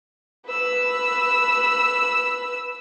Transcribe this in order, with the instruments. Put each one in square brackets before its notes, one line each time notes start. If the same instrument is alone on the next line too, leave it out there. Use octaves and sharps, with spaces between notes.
[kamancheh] B4 E6